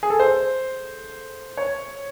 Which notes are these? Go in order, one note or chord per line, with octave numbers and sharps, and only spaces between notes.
G#4
A4
C5
C#5